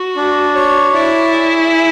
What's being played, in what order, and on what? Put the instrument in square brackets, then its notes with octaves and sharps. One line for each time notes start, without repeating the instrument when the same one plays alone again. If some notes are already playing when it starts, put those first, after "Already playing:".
Already playing: [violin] F#4
[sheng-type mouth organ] D4
C#5
[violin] E4 [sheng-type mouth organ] D5
[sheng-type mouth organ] G#4
G#5